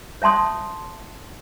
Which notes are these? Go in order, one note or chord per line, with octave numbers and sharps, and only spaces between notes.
C#5 E5 A5 C6 D#6